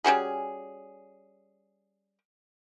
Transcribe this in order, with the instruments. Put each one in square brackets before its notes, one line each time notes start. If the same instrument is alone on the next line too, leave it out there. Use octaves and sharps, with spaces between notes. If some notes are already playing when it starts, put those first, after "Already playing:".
[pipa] G3 C#4 F#4 G#4